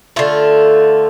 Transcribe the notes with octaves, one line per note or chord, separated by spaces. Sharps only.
D3 A3 F4